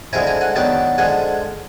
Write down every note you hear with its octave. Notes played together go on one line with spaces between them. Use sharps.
D3 F3 G#3 C4 E4 G#5 A#5
G#5 A#5
F#5 G#5
D#3 F#3 B3 D4 G5 A5
D3 F3 G#3 F#5 G#5